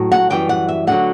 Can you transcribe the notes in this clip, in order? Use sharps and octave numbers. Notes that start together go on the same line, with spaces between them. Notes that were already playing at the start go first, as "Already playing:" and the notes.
Already playing: A2 F#3
F#5
F#2 E3 G3 G5
F#5
E5
D2 D3 F#3 F#5